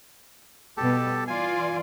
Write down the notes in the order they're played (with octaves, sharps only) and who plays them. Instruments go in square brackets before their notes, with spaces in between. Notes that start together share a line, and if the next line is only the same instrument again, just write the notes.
[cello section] B2 G3 B3 [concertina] G4 A4 A5
[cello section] E3 F4 D5 [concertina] G#5